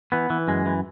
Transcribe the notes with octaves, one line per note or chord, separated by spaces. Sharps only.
E3 B3
E3
F#2 G#3
E3